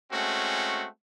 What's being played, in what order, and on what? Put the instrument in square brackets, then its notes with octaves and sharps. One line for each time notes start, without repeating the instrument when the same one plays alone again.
[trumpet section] G#3 A3 C4 C#4 F#4